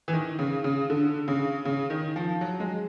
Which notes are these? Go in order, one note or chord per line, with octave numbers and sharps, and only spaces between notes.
E3
D#3
C#3
C#3
D3
C#3
C#3
D#3
F3
F#3
G#3